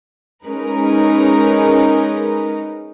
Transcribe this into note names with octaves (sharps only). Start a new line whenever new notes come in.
G#3 C#4 D#4 A#4 B4